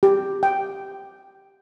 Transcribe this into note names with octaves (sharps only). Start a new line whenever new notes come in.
G4
G5